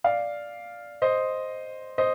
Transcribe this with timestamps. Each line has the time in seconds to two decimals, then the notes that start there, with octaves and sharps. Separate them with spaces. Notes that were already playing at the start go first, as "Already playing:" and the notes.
0.04 D5 F5
1.02 C5 D#5
1.98 C5 D#5